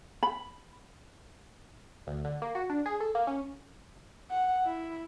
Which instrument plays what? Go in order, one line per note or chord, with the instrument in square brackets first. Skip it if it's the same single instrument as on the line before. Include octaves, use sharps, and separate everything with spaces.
[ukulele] B5
[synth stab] D2
D3
A#3
F#4
D4
G#4
A4
A#3
C#4
[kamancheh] F#5
E4